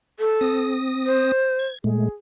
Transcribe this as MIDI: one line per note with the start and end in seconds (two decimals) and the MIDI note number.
0.20 0.73 69
0.41 1.32 60
0.41 1.32 87
0.41 1.32 94
1.06 1.68 72
1.59 1.78 92
1.84 2.09 46
1.84 2.09 56
1.84 2.09 57
1.84 2.12 68